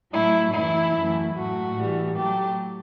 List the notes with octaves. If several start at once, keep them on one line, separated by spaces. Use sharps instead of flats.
A2 F#3 A3 E4
F#2 E3 A3 E4
F#2 E3 A3
A2 F#3 A3 F#4
A2 E3 G3
A2 F#3 A3 G4